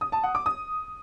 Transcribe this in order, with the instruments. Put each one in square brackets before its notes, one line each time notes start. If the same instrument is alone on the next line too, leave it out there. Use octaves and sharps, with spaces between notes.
[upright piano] D#6
A5
F#5
D6
D#6